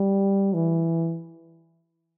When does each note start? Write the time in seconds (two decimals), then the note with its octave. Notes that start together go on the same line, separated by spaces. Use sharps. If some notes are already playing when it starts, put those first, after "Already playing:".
Already playing: G3
0.54 E3